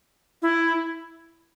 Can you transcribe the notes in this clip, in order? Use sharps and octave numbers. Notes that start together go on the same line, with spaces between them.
E4